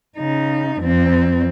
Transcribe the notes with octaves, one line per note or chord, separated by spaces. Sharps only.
C#3 D#4
F2 C4